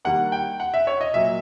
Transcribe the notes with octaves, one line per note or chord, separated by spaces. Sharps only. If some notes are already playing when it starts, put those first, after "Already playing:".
D#3 G3 A#3 F#5
G5
F#5
E5
C#5
D#5
A#2 F#3 A#3 E5